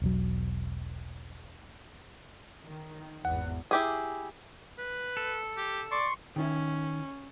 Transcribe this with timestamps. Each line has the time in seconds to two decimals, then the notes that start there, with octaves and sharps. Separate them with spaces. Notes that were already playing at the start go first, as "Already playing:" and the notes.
0.02 E1 B1 F#3
2.63 D#3
3.25 G#1 E2 F#5
3.71 E4 G4 G#4
4.78 B4
5.17 A4
5.57 G4
5.92 D5 C6 C#6
6.36 D#3 C#4 E4